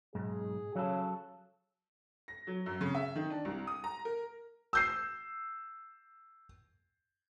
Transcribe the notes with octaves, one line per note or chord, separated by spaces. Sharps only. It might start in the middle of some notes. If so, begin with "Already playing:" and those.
B1 G#2 G#4
C#3 F#3 A4
A#6
F#3
F#2
C#3
E5
D#3
D4
C2
D#6
A#5
A#4
E6 G6 C7